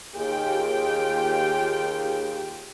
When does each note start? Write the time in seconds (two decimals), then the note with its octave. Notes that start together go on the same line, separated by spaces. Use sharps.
0.16 D#2 F4 G4 G#4 G5